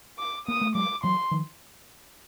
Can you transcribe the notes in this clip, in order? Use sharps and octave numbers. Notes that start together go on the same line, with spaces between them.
D6
A#3 D#6
A3
F#3 G#3 D6
E3 F#3 C6
D#3 F3